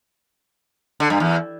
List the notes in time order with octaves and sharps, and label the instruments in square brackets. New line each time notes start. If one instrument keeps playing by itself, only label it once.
[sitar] D3
G2
E2